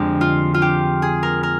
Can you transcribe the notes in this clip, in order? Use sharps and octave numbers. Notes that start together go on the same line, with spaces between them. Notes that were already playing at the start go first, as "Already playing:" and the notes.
Already playing: F2 D3 G#3 C4 G4
F4
F4
G4
G#4
A#4
A#4